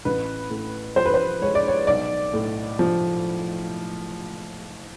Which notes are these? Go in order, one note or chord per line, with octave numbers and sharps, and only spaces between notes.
A1 B4
A2
F3 C5
B4
C5
G#3 C#5
D5
C#5
B1 D5
A2
F3